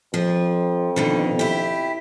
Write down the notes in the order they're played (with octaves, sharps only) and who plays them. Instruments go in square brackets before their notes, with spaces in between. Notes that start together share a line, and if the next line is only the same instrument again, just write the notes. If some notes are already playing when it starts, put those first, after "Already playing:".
[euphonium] F2 [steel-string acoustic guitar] F3
[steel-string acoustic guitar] B2 D3 D#3
E4 G4